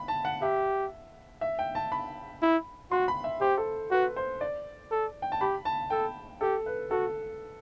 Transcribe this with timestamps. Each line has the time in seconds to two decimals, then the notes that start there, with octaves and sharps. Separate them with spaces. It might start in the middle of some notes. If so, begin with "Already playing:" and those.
Already playing: B5
0.08 A5
0.25 F#5
0.42 G4 E5
1.41 E5
1.59 G5
1.75 A5
1.92 B5
2.42 E4
2.91 F#4 C6
3.08 B5
3.24 E5
3.41 G4 C5
3.58 A4
3.91 F#4 B4
4.16 C5
4.41 D5
4.91 A4
5.22 G5
5.32 A5
5.41 G4 B5
5.65 A5
5.90 A4 G5
6.41 G4 A4
6.66 B4
6.91 F#4 A4